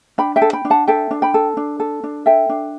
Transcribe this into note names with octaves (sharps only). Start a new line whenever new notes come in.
D4 G5 B5
E5 G5
A4
G5 B5
D4
F#5 A5
A4 E5 G5
D4
G5 B5
A4
D4
A4
D4
A4 E5 G5
D4